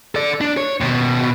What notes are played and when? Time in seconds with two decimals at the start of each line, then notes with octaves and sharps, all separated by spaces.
0.15 A4 D5
0.41 D4
0.57 C#5
0.80 D#2 B2